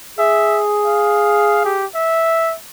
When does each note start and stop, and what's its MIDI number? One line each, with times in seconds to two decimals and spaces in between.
0.18 1.81 68
0.18 0.61 76
0.86 1.63 77
1.65 1.85 67
1.95 2.54 76